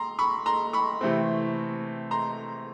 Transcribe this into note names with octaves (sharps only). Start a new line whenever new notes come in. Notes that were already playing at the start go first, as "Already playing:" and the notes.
Already playing: A#5 C6
B5 C#6
A#5 C6
B5 C#6
C3 E3 A3 C4
A#5 C6